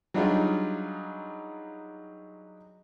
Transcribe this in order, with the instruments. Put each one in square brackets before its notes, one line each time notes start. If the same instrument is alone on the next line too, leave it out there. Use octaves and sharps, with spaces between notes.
[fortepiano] F#3 G3 D4 D#4 F4 G#4